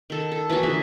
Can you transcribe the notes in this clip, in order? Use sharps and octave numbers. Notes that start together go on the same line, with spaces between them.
D#3 A4 A5
A4
E3 F#3 A#3 F#4
D3 F3 G#4 E5